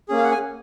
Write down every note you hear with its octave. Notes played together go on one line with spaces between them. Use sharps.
A#3 C#4 G#4
F5
F#5
G#5